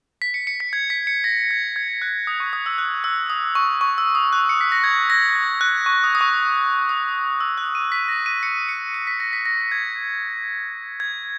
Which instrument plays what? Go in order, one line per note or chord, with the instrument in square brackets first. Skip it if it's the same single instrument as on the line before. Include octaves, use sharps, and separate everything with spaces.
[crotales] B6
C#7
C#7
B6
G#6
B6
C#7
A#6
G#6
G#6
F#6
D#6
C#6
D#6
E6
F#6
E6
D#6
C#6
C#6
E6
D#6
F#6
C#7
B6
A#6
G#6
A#6
G#6
F#6
C#6
D#6
D#6
C#6
D#6
E6
F#6
D#7
B6
A#6
D#7
C#7
C#7
C#7
B6
A#6
B6
A#6
G#6
G#6